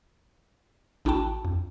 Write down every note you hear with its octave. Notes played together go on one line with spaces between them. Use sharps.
A1 D4 E4 F#4 G5 A5
F2